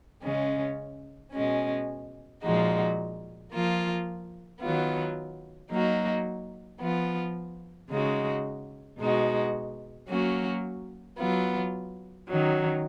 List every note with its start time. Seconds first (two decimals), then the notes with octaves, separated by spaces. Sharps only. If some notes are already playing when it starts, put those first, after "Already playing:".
0.23 C#3 G#3 C#4
1.32 B2 G#3 C#4
2.42 A#2 F3 G#3 D#4 F#4
3.51 F3 A#3 F4
4.61 D#3 F#3 B3 F4
5.71 F#3 A#3 D#4 F#4
6.80 F3 B3 F4
7.90 C#3 G#3 D#4 F#4
8.99 B2 G#3 D#4 F#4
10.08 F#3 A#3 C#4 F#4
11.18 F#3 B3 F4
12.28 D#3 F#3 C#4